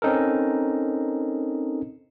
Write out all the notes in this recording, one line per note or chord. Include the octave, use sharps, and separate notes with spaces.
C4 C#4 D#4 A4 A#4